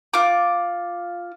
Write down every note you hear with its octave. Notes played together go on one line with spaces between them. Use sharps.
F4 D6